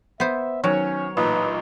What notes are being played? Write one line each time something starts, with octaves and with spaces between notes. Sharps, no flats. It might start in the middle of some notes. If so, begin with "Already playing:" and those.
B3 C5 E5
D#3 F#3 C#4 C#5
A1 A#2 D#4 B4